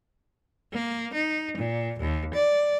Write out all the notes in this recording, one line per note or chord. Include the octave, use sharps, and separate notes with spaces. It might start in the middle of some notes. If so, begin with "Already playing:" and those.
A#3
D#4
A#2
D#2
D5